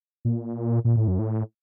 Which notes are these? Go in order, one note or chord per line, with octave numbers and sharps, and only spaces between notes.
A#2
A#2
A2
F#2
A2